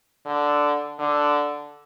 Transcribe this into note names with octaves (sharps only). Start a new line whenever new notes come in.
D3
D3